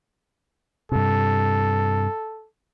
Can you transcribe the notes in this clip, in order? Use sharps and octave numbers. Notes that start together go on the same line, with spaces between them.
G2 C3 A4